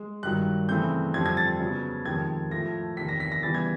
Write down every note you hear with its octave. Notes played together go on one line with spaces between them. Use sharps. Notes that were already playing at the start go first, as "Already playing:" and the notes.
Already playing: G#3
G2 D#3 F#3 F#6
C#3 E3 A3 C4 G6
F2 D3 G3 C4 G#6
G#6
A6
C#3 F#3 B3
F2 C3 D#3 G#3 G#6
A2 F3 A3 A#6
E2 C3 D#3 B6
A#6
B6
A#6
C#3 E3 G3 B3 A6
G#6